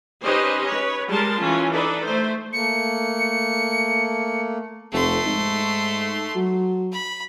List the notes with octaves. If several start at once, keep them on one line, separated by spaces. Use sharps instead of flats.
C#4 D#4 G4 B4 C5 D#5
B4 C#5
G3 G#3 G#4 A#4 A5 C6
E3 C#4 F4
D4 D#4 A4 B4
A3 C5
A3 A#3 C#7
F1 A3 C6
G#2
F#3
B5